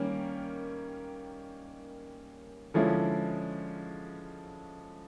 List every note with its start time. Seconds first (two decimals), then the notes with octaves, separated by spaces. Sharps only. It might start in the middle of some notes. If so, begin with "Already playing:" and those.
Already playing: D#3 G3 A#3 C#4
2.74 D3 F3 G#3 C#4 E4